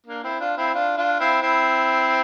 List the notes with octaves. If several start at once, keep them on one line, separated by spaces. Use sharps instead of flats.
A#3 D4
C4 E4
D4 F4
C4 E4
D4 F4
D4 F4
C4 E4
C4 E4